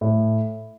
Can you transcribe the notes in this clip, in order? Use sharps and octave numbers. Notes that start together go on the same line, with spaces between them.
A2